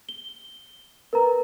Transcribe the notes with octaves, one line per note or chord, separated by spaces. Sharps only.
G7
A#4 B4 A#5